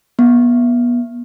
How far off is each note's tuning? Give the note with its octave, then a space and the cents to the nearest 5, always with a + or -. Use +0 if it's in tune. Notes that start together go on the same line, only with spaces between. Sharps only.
B3 -30